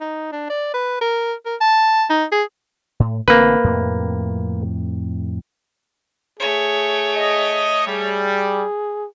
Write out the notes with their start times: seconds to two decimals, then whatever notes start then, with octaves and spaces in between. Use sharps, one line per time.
0.01 D#4
0.32 D4
0.50 D5
0.74 B4
1.01 A#4
1.46 A#4
1.61 A5
2.10 D#4
2.32 G#4
3.00 A2
3.28 A1 D3 A#3 C4 B4
3.64 F2 A2 C3
6.40 A3 G#4 C#5
7.16 D#5
7.87 G3 G#4